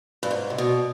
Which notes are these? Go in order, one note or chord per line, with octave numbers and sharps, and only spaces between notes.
G2
G#2
C3
B2